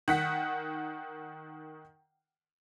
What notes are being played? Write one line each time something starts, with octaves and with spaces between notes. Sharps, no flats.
D#3 F#5 B6